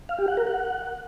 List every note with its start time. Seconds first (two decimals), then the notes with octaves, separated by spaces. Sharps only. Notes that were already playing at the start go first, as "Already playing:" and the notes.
0.09 F5
0.18 G4
0.28 F#5
0.37 A#4
0.47 F#5